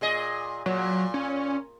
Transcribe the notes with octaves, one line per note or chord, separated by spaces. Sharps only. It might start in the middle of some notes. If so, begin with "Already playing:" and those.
A#2 G#4 D#5
A#2 F#3
C#4